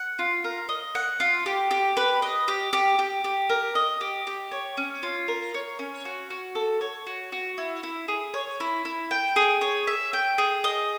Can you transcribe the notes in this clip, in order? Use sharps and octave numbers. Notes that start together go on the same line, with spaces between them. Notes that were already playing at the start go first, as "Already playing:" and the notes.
Already playing: F#5
F4
A#4
D#5
F#5
F4
G4
G4
B4
D#5
G4
G4
G4
G4
A#4
D#5
G4
G4
C#5
C#4
F4
A#4
C#5
C#4
F#4
F#4
A4
C#5
F#4
F#4
E4
E4
G#4
C#5
E4
E4
G5
G#4
C#5
E5
G5
G#4
D#5